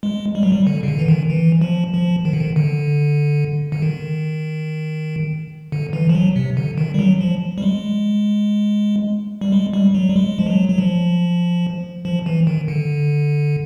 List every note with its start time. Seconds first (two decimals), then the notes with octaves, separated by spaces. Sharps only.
0.03 G#3
0.35 G3
0.43 F#3
0.52 G3
0.67 D3
0.83 C#3
0.88 D3
0.99 E3
1.08 D#3
1.30 E3
1.61 F3
1.94 F3
2.25 D#3
2.33 D3
2.40 D#3
2.56 D3
3.72 D3
3.82 D#3
5.72 D3
5.93 E3
6.09 F3
6.15 F#3
6.36 C3
6.57 D3
6.78 D#3
6.94 G3
6.99 F#3
7.21 F3
7.58 G3
7.62 G#3
9.41 G3
9.52 G#3
9.73 G3
9.94 F#3
10.09 G3
10.16 G#3
10.39 F3
10.47 F#3
10.69 F#3
10.78 F3
12.05 F3
12.26 E3
12.47 D#3
12.68 D3